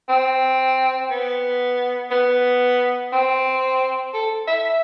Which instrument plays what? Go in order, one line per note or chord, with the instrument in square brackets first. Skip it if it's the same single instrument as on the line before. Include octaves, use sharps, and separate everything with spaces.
[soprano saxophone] C4
B3
B3
C4
A4
E5